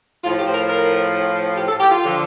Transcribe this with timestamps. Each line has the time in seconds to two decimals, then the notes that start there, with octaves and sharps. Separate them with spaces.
0.23 A2 F4
0.28 F3
0.39 G4
0.48 C5
0.53 A#4
0.68 A#4
1.57 G4
1.68 A4
1.80 G4
1.91 F4
2.03 D3 F3